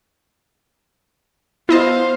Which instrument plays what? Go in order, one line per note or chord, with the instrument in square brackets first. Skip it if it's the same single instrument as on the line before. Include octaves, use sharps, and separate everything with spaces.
[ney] B3 [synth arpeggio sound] E4 D#5 A5 [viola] C5 F5